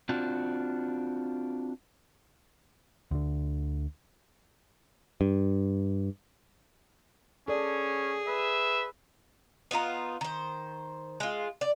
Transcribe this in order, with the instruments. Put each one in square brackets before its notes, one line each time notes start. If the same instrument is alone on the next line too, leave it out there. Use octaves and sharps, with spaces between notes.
[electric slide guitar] C4 D4 F4 F#4
[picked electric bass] D2 D3
G2
[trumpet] C#4 [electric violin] G#4 [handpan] A4 D5
[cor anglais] B4 [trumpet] E5
[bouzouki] B3 D#4 F4 A#4
D#3 C5
G#3 F4
D5